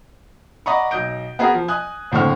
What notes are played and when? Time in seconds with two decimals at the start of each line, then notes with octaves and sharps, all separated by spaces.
0.66 D5 D#5 F#5 A#5 B5 C#6
0.91 B1 D#5 G6 D7
1.39 B3 F#4 G#4 A#4
1.54 F3
1.68 G#5 D#6 F#6
2.12 F#1 A2 D3 C4 C#6 F6